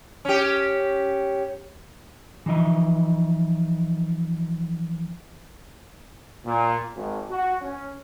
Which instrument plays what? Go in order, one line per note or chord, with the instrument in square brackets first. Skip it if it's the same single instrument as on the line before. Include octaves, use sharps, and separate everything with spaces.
[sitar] C#4 G4
[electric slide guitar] E3 F3 D#4 D#5 E5
[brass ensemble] A#2
G#1
F#4
C#4